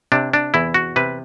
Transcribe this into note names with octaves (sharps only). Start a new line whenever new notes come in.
C3 D4
D4
E2 E4
F#4
C3 B4